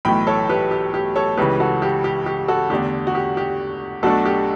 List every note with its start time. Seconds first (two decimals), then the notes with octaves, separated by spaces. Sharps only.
0.05 B1 A2 E3 A3 G5 B5
0.27 A4 C#5
0.49 G4 B4
0.71 G4
0.94 G4
1.16 A4 C#5
1.37 C#2 C#3 E3 G4 B4
1.60 F#4 A4
1.82 G4
2.04 G4
2.26 G4
2.48 F#4 A4
2.70 E2 D3 A3 D4 G4
3.07 F#4
3.15 G4
3.37 G4
4.03 B1 B2 A3 D4 F#4 A4
4.25 G4